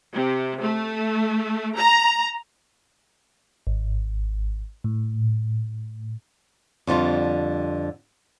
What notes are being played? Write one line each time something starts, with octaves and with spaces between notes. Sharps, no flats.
C3
A3
A#5
G#1
A2
F2 D3 G3 F4